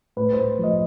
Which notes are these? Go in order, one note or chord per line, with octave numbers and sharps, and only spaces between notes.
A2 B4
C5
A2
F3
D#5